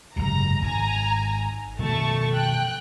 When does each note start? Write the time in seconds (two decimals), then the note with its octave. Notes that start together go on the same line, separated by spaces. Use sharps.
0.16 F#1 G#2 C3 A#5
0.61 G#1 G#2 G#5 A#5
1.79 B2 D#3 F3 A3 A5 C#6
2.32 G5 F#6